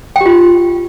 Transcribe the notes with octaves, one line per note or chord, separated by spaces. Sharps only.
G5
G4
F4